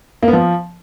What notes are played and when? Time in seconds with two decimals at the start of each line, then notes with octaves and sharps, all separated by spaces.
0.23 A#3
0.28 B3
0.33 F3